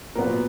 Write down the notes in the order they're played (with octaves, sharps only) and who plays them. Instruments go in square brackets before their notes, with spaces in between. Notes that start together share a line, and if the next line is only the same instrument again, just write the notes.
[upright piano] A#2 F#3 B3 A#4